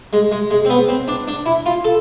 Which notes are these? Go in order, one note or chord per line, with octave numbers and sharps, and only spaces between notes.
G#3
G#3
G#3
C4
B3
C4
D4
D4
E4
F4
A4